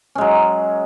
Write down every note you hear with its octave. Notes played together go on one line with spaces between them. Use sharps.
F#3 G#3 C#4